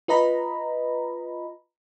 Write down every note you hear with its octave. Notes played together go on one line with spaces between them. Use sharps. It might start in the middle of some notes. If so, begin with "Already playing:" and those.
F4 B4 D#5 A#5 B5